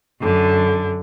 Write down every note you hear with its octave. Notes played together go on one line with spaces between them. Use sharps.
F#2 D3